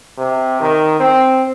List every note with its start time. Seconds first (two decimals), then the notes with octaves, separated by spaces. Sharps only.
0.18 C3
0.61 D#3
0.99 C4